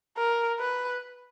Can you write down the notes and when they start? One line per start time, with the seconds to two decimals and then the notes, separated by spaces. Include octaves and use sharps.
0.17 A#4
0.59 B4